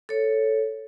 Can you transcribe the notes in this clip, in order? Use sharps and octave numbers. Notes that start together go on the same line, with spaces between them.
A4 C#5